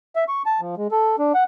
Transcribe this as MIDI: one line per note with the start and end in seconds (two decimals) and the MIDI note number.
0.16 0.24 76
0.28 0.43 85
0.46 0.61 81
0.61 0.75 53
0.77 0.88 56
0.91 1.16 69
1.19 1.33 62
1.34 1.44 78